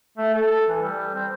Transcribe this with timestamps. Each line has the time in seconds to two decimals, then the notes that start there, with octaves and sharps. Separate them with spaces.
0.18 A3
0.34 A4
0.69 E3
0.82 G3
1.14 C4